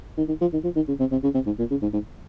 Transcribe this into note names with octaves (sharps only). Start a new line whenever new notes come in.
D#3
D#3
F3
D#3
F3
D#3
C#3
C3
C3
C#3
C3
G#2
A#2
C#3
G#2
G#2